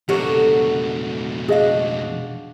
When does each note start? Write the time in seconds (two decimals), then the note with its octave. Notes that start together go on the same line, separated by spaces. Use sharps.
0.09 F2 B2 D3 F#3 F#4 G4 A#4 C#5
1.48 D4 F#4 G#4 D#5 F5